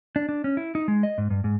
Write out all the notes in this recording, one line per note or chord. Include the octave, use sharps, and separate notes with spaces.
D4
D4
C#4
E4
D#4
G#3
D#5
G#2
G2
G#2